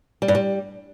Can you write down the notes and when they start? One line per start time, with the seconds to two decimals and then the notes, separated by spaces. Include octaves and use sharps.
0.22 G3
0.28 G2
0.35 G3